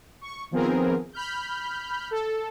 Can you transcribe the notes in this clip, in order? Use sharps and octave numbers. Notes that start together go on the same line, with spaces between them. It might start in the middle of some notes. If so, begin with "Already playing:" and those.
C#6
D#3 F3 B3 C4 G#4 A#4
B5 F6 G6
A4